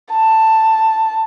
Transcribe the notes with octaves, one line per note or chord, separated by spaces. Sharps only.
A5